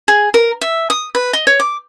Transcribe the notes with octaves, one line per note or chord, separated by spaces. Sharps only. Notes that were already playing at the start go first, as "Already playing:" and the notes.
G#4
A#4
E5
D#6
B4
D#5
C#5
D6